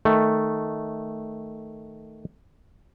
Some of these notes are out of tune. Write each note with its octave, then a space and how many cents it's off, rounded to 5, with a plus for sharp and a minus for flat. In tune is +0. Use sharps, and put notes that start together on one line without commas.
D#3 +0 A3 +0